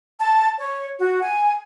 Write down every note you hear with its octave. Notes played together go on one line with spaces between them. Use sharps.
A5
C#5
F#4
G#5